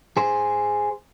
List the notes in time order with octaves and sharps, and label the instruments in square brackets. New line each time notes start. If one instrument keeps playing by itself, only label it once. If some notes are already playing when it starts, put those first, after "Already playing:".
[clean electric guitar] G#4 C5